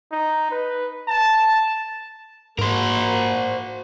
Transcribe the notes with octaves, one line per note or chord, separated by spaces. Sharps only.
D#4
B4
A5
G#2 A#3 F#4 A#4 C5